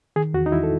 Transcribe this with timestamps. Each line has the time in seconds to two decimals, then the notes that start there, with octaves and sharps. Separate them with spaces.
0.16 D#3 G#4
0.34 E2 F#4
0.46 D#4
0.52 E2 E4
0.63 A4